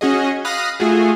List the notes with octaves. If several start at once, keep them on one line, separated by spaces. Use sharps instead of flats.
C#4 F#4 G#4 D#5
F5 B5 D#6 F#6 A#6
A3 F4 F#4 G#4